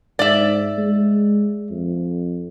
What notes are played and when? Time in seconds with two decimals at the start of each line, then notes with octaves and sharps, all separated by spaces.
0.19 G#2 D5 E5
0.78 G#3
1.71 F2